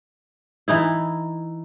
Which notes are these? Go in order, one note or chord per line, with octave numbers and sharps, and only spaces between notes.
E3 D#4 E4